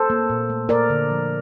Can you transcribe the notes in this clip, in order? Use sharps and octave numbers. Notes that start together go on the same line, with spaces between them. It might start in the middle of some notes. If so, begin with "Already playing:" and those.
Already playing: A4 C5
A#3
A#2
A3
A#3 A#4 D5
D3
F3